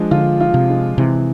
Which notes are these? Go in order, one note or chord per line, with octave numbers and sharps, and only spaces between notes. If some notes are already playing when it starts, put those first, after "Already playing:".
Already playing: F3 G#3 D4
D3 F4
F4
C3
G#3
C3 E3